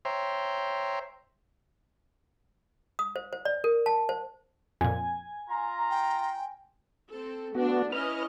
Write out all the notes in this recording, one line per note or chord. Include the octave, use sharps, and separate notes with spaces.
C5 C#5 E5 G5 A#5 C6
D#6
C5
C5
D5
A#4
A5
C5
F2 A#2 G#5
F4 A#5
G5
C4 A4
A3 B3 D4 F#4
C#4 E4 B4 D#5 F6